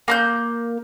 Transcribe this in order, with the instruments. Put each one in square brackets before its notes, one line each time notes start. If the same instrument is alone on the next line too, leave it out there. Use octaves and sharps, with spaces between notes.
[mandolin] A#3 A#5 G6